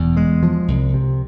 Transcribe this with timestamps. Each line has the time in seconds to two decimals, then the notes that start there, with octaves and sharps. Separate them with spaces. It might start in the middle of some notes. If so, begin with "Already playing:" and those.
Already playing: E1 E2
0.17 G#3
0.43 F3
0.68 C2
0.94 C3